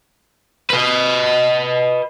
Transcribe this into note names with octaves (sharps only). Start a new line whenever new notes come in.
B4 D#5